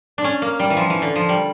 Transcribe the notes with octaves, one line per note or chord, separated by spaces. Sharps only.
D4
C#4
A#3
G3
E3
F3
E3
D3
F3
G3